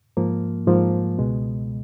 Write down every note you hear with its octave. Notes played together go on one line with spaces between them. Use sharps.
G#2 F3 A#3
G#2 F3 A#3
C#2 B2 G#3